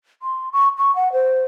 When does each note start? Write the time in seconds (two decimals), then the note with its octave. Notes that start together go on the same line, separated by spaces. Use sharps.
0.22 C6
0.53 C#6
0.78 C#6
0.96 F#5
1.13 C5